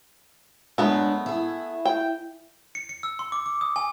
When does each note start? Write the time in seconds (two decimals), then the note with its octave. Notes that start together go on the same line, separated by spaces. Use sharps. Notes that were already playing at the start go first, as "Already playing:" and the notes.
0.78 F#2 G#3 A3 B3 D4
1.26 E4 G#4
1.85 G5
2.75 C#7
2.89 C#7
3.03 E6
3.19 C6
3.32 D6
3.46 D6
3.61 D#6
3.76 G#5